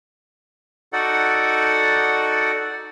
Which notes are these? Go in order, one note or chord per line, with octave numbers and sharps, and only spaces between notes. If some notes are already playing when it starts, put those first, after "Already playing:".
D#4 F#4 A4 D5 F#5